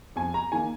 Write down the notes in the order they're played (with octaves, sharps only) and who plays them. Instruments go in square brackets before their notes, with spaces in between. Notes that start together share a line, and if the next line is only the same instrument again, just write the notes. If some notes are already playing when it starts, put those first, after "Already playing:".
[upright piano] F2 G#5
A#5
D#3 A#3 G#5